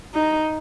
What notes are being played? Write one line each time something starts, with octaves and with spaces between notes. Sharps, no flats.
D#4